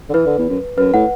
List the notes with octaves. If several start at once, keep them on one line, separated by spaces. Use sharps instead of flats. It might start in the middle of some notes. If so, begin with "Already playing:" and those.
D3
E3 B4
D3
E2
F#2
F#2 B4
A2 F#5